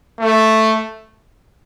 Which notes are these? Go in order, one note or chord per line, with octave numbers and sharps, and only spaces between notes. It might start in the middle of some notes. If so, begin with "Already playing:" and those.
A3